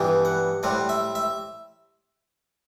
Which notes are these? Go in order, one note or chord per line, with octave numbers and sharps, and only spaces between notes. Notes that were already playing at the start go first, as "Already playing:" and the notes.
Already playing: G2 E3 G3 B3 G5
F#5
A2 G3 C4 F#5
E5
E5